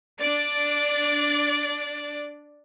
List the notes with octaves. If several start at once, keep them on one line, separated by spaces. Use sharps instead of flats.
D4 D5